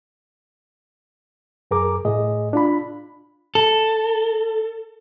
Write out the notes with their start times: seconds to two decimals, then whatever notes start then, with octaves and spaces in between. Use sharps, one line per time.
1.71 F#2 G#4 A#4 D6
2.05 A2 G#4 D#5
2.53 D4 F4 B5
3.55 A4